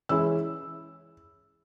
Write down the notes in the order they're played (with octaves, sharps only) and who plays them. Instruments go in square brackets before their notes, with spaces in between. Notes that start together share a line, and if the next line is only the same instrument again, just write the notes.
[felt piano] E3 G#3 C#4 E4 E6